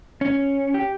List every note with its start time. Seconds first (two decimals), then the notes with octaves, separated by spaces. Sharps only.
0.21 C#4
0.74 G4